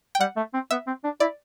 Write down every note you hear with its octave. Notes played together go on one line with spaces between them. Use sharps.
G5
G3 F#5
A3
C4
B3 E5
C4
D4
E4 D5